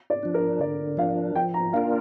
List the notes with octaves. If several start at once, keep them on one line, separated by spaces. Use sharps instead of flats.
D5
F3 D4
A#4
D3 D5
F3 D4 F5
F3 G5
A#5
A#3 D4 F4 A#4 F5